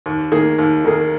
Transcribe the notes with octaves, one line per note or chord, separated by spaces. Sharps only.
D#2
D#3 A#3 G#4
D#2
D#3 A#3 G#4